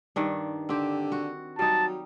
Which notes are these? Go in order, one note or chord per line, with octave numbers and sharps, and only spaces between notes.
G2 D#3 D4
D3 C4 G4
F#4
F#3 G3 D#4 A5